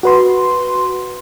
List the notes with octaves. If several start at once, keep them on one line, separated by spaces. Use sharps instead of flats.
F#4 B4 C6